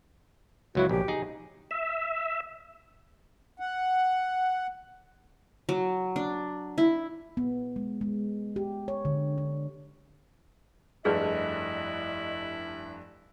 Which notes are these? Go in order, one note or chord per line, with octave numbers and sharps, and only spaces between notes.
C#2 F#3 E4 F#4
A#1 G4
D#4 G#4
E5
F#5
F#3
D4
E4
B3
G#3
G#3
G4
C#5
D3
D4
F1 G2 E4 G#4 A4 B4 D5 D#5